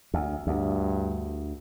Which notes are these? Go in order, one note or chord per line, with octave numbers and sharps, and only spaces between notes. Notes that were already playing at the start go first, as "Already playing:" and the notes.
D2
D2 G2